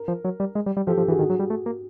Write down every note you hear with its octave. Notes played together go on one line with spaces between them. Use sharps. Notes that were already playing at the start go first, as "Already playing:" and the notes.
Already playing: A#4
F3
F#3
G3
G#3
G3
G3
F3 G4 A4
F3 G4 A4
E3 F#4 G#4
D#3 F#4 G#4
F#3
G3
A3
A#3